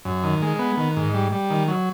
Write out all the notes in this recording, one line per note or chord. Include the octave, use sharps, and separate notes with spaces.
F#2
D#3
G#3
B3
D#3
G#2
G3
G3
D#3
F#3